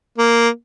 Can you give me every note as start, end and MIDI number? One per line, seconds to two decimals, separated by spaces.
0.18 0.49 58